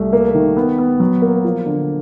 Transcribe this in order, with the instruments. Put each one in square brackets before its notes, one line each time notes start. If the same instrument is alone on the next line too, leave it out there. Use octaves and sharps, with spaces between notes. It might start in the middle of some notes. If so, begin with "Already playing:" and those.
Already playing: [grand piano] C2 A3
A#3
D#3
B3
B3
F#3
A#3
F3
D3